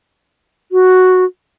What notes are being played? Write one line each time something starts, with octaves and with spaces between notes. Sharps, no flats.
F#4